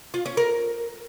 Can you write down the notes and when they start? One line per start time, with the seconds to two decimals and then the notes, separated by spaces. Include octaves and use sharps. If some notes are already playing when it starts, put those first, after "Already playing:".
0.14 F4
0.26 C#4
0.37 A#4